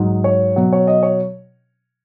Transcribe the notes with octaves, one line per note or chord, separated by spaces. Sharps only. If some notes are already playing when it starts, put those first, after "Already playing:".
Already playing: G#2 F#3 D#5
C#5
B2 F#3
C#5
D#5
C#5